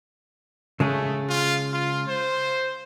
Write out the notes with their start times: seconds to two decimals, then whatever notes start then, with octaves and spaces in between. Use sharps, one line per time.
0.80 C#3 G#3 A3 G#4
1.29 F4
1.73 F4
2.08 C5